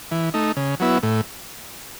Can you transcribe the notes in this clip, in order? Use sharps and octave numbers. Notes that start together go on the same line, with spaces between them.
E3
A3 D#4
C#3
F#3 B3 E4
A2